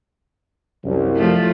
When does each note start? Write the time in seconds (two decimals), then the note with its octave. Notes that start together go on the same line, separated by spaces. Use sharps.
0.84 C2 F#2
1.17 F3 A3